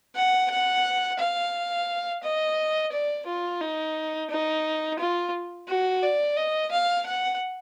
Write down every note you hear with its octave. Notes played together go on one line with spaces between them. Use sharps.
F#5
F#5
F5
D#5
D5
F4
D#4
D#4
F4
F#4
D5
D#5
F5
F#5